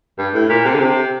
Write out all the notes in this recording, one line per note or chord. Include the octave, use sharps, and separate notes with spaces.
G2
A2
A#2
C3
D3
C3